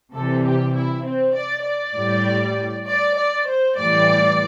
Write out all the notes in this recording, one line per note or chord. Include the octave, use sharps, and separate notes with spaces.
C3 E3 G3 A4
G4
E4
C4
D5
D5
A2 G3
D5
D5
C5
A2 E3 G3 D5